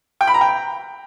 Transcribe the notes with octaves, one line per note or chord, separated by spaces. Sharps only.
G5
B5
A#5
G5